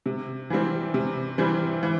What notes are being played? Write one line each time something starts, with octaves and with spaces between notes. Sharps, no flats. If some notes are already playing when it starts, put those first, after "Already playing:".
C3
E3 G3 C4
C3
E3 G3 C4
E3